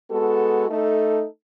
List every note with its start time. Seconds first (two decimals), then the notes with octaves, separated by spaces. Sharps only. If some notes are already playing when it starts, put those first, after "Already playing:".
0.10 G#3 B3 F#4 A4
0.68 A3 D#4 A4